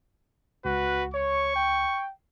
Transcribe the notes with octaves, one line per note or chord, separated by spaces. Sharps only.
C#2 F#4 B4
C#5 C#6
G5